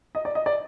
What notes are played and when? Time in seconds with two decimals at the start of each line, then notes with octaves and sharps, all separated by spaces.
0.15 D#5
0.25 D5
0.35 D#5
0.46 D5